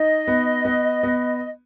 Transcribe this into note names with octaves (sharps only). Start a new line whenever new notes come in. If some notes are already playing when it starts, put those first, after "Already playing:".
Already playing: D#4 D#5
B3
B3
B3